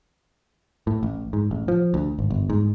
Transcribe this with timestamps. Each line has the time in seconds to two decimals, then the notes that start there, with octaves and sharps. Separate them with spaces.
0.87 A2
1.03 A1
1.33 G#2
1.51 A1
1.68 F3
1.94 D2
2.19 G#1
2.31 G1
2.50 G#2